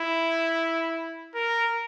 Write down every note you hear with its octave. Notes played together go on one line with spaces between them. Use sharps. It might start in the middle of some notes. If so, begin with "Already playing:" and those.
Already playing: E4
A#4